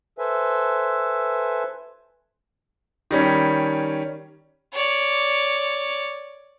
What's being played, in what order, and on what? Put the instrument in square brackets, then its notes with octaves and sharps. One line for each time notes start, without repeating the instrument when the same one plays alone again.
[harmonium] A4 B4 C5 E5 G#5
[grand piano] D#3 G3 C#4
[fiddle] C#5 D5